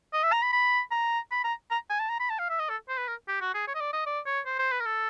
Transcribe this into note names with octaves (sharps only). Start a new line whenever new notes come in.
D#5
E5
A#5
B5
B5
A#5
B5
A#5
A#5
G#5
A5
A#5
B5
A5
F5
E5
D#5
A4
C5
B4
A#4
G4
F#4
G#4
C#5
D#5
D5
D#5
D5
C#5
C5
C5
B4
A#4
A4